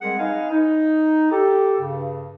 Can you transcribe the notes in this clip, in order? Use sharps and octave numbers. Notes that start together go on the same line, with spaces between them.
G3 G#3 C4 G#4 A#4 F#5
D#4 B4 D#5 F5 G#5
D#4
G4 A4
G2 C#3